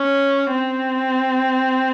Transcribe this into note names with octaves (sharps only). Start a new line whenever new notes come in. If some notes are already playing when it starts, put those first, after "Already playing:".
Already playing: C#4
C4